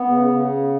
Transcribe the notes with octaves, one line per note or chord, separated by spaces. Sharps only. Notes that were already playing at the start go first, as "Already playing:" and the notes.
Already playing: B3
C#3
C#3